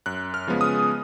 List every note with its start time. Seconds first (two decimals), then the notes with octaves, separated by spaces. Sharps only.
0.06 F#2 F#6
0.34 F6
0.47 C#3 F3 G#3 B3
0.61 D#6